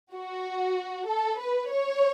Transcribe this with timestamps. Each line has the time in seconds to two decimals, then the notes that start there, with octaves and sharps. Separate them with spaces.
0.13 F#4
1.08 A4
1.39 B4
1.70 C#5